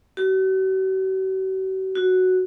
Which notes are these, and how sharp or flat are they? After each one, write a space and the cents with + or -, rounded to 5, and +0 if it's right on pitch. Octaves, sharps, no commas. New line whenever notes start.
F#4 +45
F#4 +0